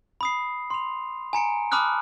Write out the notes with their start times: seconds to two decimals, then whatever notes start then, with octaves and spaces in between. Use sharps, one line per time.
0.21 B5 D#6 C7
0.70 C6 F7
1.33 G#5 A#5 C#7 D7
1.72 A5 B5 D6 D#6 F6 F#6